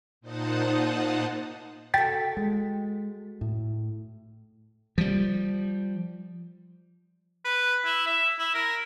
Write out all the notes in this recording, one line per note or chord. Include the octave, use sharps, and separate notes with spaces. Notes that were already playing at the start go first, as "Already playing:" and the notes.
A#2 D#4 C5 F#5 A5 D#6
F#4 A4 G5 A6 B6
G#3
A2
F3 G3
B4
E4
E5
E4
A#4